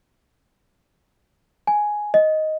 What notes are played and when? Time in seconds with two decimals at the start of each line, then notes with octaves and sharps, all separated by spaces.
1.67 G#5
2.14 D#5